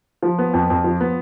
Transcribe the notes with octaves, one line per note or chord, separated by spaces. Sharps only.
F3
B3
F2
F2
F3
B3